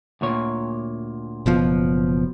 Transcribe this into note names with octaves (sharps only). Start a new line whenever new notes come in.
D2 A#2 C#5
F#1 B2 F3